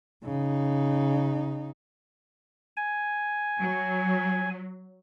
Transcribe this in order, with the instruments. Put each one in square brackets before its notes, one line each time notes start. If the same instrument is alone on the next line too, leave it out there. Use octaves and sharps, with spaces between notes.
[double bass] C#3 D#4
[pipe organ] G#5
[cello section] F#3